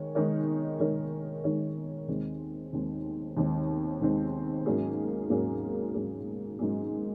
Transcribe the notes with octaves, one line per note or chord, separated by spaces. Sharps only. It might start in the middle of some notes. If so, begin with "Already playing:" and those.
Already playing: D#3 G#3 A#4 C#5
D#3 G#3 D#4 A#4 C#5
D#3 G#3 D#4 A#4 C#5
D#3 G#3 D#4 A#4 C#5
D#2 D#3 G#3 C4
D#2 D#3 G#3 C4
D#2 D#3 G#3 C4
D#2 D#3 G#3 C4
G#2 F#3 A#3 C#4 G#4
G#2 F#3 A#3 C#4 G#4
G#2 F#3 A#3 C#4 G#4
G#2 F#3 A#3 C#4 G#4